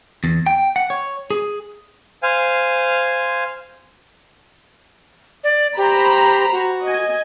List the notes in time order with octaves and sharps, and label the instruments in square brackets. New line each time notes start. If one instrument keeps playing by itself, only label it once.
[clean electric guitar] E2
G5
F#5
C#5
G#4
[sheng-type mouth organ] C5 F5 G#5
[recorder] D5
[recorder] G4 [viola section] C5 A#5 B5
[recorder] F#4
[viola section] D#5 G#5